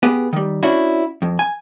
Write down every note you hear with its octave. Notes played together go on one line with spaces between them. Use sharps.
B3 G4 G#4
D#3 G3
C#4 D4 E4 F#4
F2
G#5